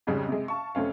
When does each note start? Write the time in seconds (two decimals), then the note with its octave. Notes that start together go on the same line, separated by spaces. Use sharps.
0.07 F2 G#2 C#3 G3 C#4
0.28 C3 G#3
0.48 F5 A5 C#6
0.75 F1 A3 C4 C#4 F5